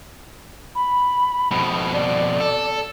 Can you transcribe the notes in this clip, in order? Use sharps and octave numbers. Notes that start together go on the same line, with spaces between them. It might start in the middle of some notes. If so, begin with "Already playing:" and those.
B5
F2 B2
D5
A4